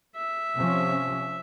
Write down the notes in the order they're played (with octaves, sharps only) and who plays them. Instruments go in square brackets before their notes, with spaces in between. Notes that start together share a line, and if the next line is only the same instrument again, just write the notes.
[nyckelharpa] E5
[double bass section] C3 F3 C#4